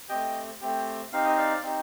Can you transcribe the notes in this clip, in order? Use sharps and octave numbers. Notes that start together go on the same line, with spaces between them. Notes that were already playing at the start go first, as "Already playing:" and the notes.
A3 C4 G4 D#5 G5
A3 C4 G4
C4 D#4 G4 F5
D#5
D5 F5
C4 D#4 G4